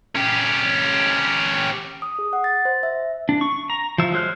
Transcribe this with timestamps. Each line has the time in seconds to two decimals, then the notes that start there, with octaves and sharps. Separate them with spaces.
0.16 C#4 G4
2.02 D#6
2.19 G#4
2.33 F#5
2.44 A6
2.65 C5
2.83 E5
3.29 D4
3.41 C#6
3.70 A#5
3.98 F3 E5
4.13 F#3 G#3 C5 F6 F#6